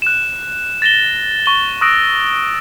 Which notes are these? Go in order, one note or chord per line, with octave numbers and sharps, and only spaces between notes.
F#6 E7
A6 A#6 E7 G7
C#6 G7
C#6 D#6 E6 F#6 A#6 D7